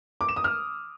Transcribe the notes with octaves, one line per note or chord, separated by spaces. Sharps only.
D6
E7
D#6
F6